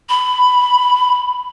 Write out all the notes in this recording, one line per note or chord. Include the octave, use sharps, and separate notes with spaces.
B5